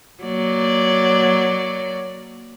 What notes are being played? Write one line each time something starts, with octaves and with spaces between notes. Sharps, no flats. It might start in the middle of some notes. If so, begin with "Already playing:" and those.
F#3 A#3 D5